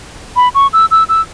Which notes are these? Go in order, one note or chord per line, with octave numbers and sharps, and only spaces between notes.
B5
C#6
E6
E6
E6